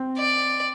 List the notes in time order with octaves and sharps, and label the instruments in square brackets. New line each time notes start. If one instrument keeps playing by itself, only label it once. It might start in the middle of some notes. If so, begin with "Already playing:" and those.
Already playing: [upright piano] C4
[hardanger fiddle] D5